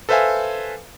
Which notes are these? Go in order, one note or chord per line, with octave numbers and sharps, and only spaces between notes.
A4 B4 C5 E5 F5 G#5